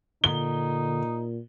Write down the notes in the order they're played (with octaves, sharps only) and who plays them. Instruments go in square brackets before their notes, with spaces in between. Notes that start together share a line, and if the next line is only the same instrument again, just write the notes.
[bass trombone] A#2 [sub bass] D3 [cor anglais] D#4 [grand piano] G7